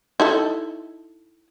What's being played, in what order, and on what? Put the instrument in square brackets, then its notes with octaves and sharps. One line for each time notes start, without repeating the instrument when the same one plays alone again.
[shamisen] D#4 E4 A4